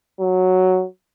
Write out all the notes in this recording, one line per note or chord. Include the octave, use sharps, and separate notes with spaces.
F#3